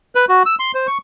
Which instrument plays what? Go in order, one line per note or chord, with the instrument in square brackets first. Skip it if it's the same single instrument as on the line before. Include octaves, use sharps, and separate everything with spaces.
[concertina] B4
F#4
E6
C6
C5
C#6